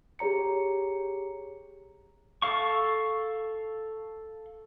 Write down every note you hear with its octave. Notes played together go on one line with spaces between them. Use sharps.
G4 G#4 C#5 A#5 C#7
A4 F5 C#6